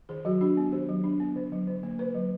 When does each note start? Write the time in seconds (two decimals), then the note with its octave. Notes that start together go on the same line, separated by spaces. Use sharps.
0.09 D#3 G#4
0.25 F#3 F#4
0.41 D4 F#4
0.57 B3
0.72 D#3 G4
0.89 F#3
1.04 D4
1.20 B3
1.36 D3
1.52 F#3
1.67 D3
1.83 A#3
1.99 D3 B4
2.14 F#3